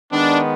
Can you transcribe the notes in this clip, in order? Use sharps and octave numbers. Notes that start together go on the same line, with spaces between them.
D#3 G#3 B3 D4